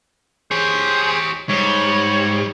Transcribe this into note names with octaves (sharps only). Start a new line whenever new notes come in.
G4 G#4 C5 C#5
G#2 G3 C#5